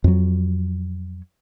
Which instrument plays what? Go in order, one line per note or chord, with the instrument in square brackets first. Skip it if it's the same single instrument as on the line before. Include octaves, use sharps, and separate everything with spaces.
[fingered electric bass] F2 F#3